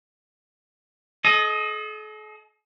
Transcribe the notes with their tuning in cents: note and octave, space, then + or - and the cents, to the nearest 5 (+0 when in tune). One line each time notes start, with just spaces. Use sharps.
A4 -45 D#5 +5